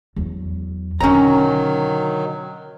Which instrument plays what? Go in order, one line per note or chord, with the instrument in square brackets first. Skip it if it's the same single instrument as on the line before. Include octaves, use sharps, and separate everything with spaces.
[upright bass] E2 F#3
[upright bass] B2 D3 [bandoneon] D#3 F#3 [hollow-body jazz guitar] C#4 A#5